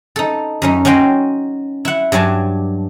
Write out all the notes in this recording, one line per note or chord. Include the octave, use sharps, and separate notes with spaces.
D#4 A4
F#2 C#4 D#4
C#4 F#4 D#5 G5 C6
E4 F#5
G2 F#3 D4 G#5 A5